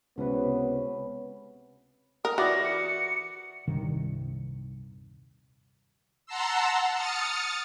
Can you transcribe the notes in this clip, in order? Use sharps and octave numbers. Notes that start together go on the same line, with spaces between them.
C#2 C3 B3 C#4 B4
A#4 D#6
E3 F#4 D5 A#6
C#7
D#1 C2 G2 D#3
F#5 A5 A#5 C6 E6
D#6 F6 A6 C#7